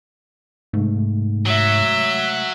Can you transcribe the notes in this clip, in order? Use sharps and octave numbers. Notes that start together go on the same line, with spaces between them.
G#2 C3 G#3 A3
F#3 E5